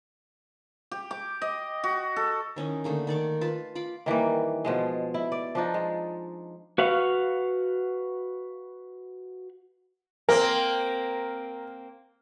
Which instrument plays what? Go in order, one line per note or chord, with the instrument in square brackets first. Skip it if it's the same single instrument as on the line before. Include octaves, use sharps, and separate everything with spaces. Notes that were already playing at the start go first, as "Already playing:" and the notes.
[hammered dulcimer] G4
D6
D#5
F#4
A4
[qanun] D#3 C#4 E4 D#5
D3 A3 A#3 D#4
D#3 D5 C#6 D6
F4 B4 A5
F4 B5 D6
[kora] D#3 E3 G3 A#3
B2 F3 G#3
E4
D5
F3 D4 D#4
G#3
[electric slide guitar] F#4 B4 F5 F#5
[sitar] A#3 C4 [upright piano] A#4